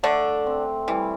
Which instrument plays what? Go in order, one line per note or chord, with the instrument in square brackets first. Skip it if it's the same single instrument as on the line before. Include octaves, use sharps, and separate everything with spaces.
[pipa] D3 D4 [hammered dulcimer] A3
[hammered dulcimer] C4
[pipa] E3 [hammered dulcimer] G3